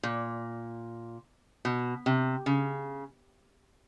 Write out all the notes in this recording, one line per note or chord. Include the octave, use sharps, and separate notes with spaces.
A#2
B2
C3
C#3